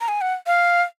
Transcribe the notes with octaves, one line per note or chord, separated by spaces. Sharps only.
A#5
G#5
F#5
F5